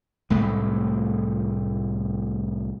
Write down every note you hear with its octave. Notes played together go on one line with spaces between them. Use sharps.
C2 A2 G#3 A3